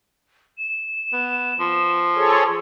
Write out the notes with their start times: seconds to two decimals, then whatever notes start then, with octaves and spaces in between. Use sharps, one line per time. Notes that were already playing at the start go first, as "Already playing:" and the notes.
0.58 E7
1.13 B3
1.60 F3
2.16 G#4 A4 C#5